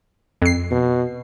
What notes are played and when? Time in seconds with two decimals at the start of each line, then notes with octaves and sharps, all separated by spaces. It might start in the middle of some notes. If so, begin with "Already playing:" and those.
0.42 F2 C7
0.71 B2